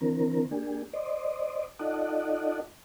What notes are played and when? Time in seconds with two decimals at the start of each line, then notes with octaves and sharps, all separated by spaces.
0.01 D3 E3 C4 A#4
0.51 A#3 D4 G4 G#4
0.93 C5 D5 D#5
1.79 D#4 F4 A4 D5 D#5 F#5